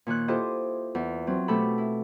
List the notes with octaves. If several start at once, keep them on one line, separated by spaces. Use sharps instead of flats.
A#2 D#3 C#5 F#6
E4 F4 G4 A4 C5 D#5
E2
F#3 C4
B2 A3 G4 A4 B5
E4